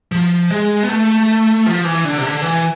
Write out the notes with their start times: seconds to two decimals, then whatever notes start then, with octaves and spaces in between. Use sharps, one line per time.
0.12 F3
0.50 G#3
0.83 B3
0.89 A3
1.66 F3
1.84 E3
2.05 D3
2.18 C3
2.23 D3
2.42 E3